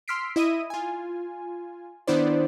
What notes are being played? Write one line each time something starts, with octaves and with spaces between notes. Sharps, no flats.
C6 E6 F6 B6 C7 D7
E4 D#5 E5 D#6 D#7
F4 G#5
D#3 B3 D4 E4 C5 D5